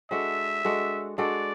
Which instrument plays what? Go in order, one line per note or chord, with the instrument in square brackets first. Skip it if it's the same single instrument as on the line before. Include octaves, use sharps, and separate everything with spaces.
[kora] G#3 D4 F#4 A4 [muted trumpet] E5
[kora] G#3 D4 F#4 A4
[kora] G#3 D4 F#4 A4 [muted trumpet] D5